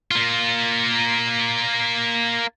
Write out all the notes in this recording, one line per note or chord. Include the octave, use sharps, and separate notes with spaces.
A#3 F4